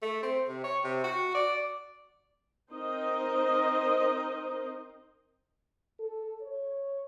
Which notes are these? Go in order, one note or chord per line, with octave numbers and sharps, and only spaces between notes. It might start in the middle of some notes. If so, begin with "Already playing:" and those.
A3
C4
C3
C#5
C3
F#4
D5
C4 D#4 A#4 C5 D#5
A4
C#5